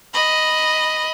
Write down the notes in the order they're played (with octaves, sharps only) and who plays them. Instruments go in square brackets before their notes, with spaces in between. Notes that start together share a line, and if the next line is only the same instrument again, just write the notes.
[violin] D#5 B5